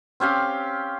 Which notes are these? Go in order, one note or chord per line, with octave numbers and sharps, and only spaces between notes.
C4 C#4 G4 F5